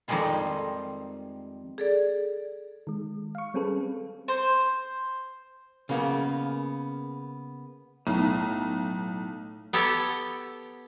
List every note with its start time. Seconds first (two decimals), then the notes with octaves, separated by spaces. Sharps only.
0.08 F2 D#3 F3 G3 G#3 F4
1.78 G#4 A4 D5
2.87 D#3 G#3
3.35 F5 C#6
3.54 G3 C4 C#4 G#4 A4 B4
4.28 C5
5.89 C#3 A#3 B3
8.07 B1 A2
9.73 B3 G4 A4 C#5 G5